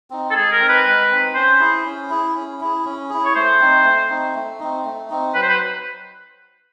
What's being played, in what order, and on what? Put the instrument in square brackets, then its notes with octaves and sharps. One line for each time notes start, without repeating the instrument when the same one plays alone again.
[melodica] C4 D#4
[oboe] A4
[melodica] G#3 [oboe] G#4
[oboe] A#4
[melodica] C4 D#4
[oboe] B4
[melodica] G#3
C4 D#4
[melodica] C#4 [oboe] C5
[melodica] E4 G#4
C#4
E4 G#4
C#4
E4 G#4
C#4
E4 G#4
[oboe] C#5
[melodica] A3 [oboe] C5
[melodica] C4 D#4
A3
C4 D#4
A3
C4 D#4
A3
C4 D#4
[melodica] F#3 [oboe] B4
[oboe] C5
B4